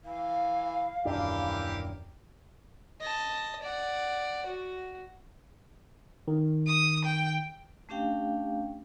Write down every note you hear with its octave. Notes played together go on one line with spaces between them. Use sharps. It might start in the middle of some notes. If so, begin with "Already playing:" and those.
E3 F5
D#1 F#2 E3 A#3 D4 G4
D#5 A5
D5 F#5
F#4
D#3
D#6
G5
A3 C#4 D4 G4 F5 G5